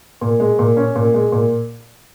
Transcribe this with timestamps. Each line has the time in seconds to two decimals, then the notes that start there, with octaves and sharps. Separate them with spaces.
0.21 A#2
0.40 G#3
0.59 A#2
0.77 C#4
0.96 A#2
1.14 G#3
1.32 A#2